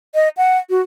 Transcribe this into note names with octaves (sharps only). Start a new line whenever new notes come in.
D#5
F#5
F#4